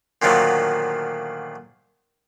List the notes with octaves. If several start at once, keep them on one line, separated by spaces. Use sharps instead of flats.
A#2 D3 D#3 F3 F#3 A3